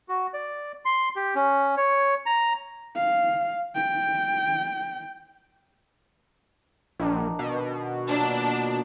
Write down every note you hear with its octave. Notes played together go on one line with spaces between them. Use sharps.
F#4
D5
C6
G4
C#4
C#5
A#5
F5
G5
A#1 D#3 D4
B2
A#2 F#3 D4